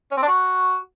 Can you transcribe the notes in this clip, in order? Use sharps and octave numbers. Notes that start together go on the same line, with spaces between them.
C#4
C4
D4
F#4